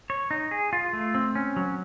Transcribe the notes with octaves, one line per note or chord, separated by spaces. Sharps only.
C#5
D#4
G#4
F4
A3
C4
C#4
F#3